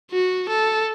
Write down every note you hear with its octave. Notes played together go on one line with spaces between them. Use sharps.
F#4
A4